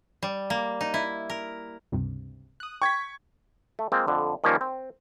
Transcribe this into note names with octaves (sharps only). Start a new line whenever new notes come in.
G3
A#3
D#4
E4
A#4
C#2 G2 C3
D#6 F#6
G5 C#6 G#6 B6
A3
G#3 A#3 C4 F4
F2 D3
D#3 F3 G3 A#3 C#4
C4